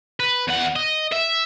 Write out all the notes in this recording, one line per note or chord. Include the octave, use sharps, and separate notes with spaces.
B4
E2 F#5
D#5
E5